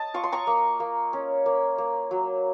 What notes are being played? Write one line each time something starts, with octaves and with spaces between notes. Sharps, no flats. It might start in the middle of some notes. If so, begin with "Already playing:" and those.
Already playing: D#5 A5
F4 C#6
C6
A#5 C#6
A#3
A#3
C#4
A#3
A#3
F#3